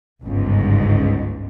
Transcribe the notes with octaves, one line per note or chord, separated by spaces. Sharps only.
G1 C#2 G#2